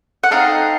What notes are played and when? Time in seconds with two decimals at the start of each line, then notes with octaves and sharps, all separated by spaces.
0.23 F#5
0.31 A3 C4 D#4 D#5 F5